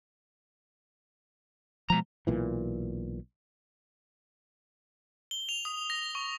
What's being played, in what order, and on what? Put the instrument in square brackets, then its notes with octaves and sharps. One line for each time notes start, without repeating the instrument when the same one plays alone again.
[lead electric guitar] B2 A#5 [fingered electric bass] F3 G#3
[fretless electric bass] B1 A#2 E3
[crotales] G7
F7
D#6
A#6
C#6